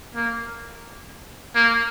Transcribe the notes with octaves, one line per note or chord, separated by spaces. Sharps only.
A#3
A#3